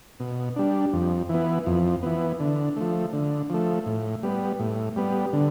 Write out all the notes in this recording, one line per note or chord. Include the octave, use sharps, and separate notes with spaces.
B2
G3 D4
F2
E3 B3
F2
E3 B3
D3
F3 A3
D3
F3 A3
A2
G3 B3
A2
G3 B3
D3